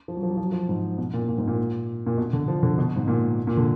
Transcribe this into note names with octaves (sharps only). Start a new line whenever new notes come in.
F3
F#3
F3
F#3
F3
F#3
F3
G#2
B2
A#2
A#2
G#2
A#2
A#2
B2
D3
F3
D3
B2
G#2
A#2
A#2
D3